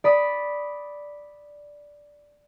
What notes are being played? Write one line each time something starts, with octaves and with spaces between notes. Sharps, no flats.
D5 B5 D#6